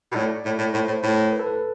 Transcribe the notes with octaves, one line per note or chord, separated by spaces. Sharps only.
B2
A2 D5
A2
A2
A2 C5
A2
A2
B4
A4
B4